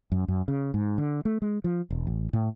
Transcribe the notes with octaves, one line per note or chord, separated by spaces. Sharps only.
F#2
F#2
C#3
G#2
D3
A3
G#3
F3
E1
A1
A2